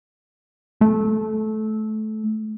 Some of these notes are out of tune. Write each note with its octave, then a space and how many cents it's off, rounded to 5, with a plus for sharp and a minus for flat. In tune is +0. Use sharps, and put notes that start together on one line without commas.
A3 -20